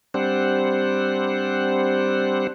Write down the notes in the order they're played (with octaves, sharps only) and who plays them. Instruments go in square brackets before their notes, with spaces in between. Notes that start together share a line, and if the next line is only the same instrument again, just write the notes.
[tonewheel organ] G3 C4 D4 C5 F#5